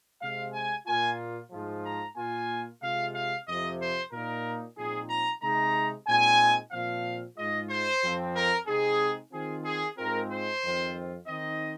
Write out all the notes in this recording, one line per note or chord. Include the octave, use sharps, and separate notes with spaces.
C3 G#3 C4 F5
G#5
A#2 A#3 F4 G#5
G#2 F3 G#3 F4
A#5
A#2 A#3 F4 G#5
C3 G#3 F4 F5
F5
F2 C3 F3 C4 D#5
C5
A#2 A#3 D#4 A#4
A#2 F3 C4 D#4 G#4
A#5
C3 G#3 D#4 A#5
A#2 G#3 C4 D#4 G#5
A#2 F3 C4 F5
G#2 G#3 F4 D#5
C5
F2 F3 C4
A#4
C3 G#3 C4 D#4 G#4
D#3 C4 F4 G#4
G#4
G#2 G#3 C4 F4 A#4
C5
F2 D#3 C4 F4
D#3 C4 D#4 D#5